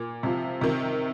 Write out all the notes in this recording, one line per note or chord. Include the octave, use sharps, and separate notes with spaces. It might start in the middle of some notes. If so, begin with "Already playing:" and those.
Already playing: A#2
C3 F3
C3 D#3